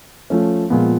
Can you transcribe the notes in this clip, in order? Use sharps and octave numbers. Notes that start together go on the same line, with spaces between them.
F3 A3 C#4
A#2 F3 G#3 B3